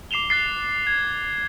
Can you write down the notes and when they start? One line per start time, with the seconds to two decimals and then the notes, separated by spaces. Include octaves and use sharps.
0.11 D6 C7 E7 F7 G7
0.30 F#6 A6 C7
0.87 G#6